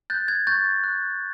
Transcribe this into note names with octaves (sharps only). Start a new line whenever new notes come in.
F#6 G6 A6
G#6
C#6 G6 A6
F#6